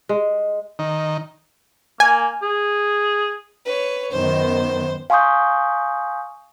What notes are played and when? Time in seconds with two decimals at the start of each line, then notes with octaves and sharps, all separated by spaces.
0.09 G#3
0.79 D#3
2.00 A#3 G#5
2.43 G#4
3.65 B4 C#5
4.11 F#2 D#3 B3 C5
5.10 F5 G#5 C6 C#6 D#6 G6